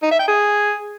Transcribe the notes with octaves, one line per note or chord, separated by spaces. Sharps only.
D#4
E5
G5
G#4